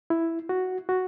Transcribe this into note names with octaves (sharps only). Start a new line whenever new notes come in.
E4
F#4
F#4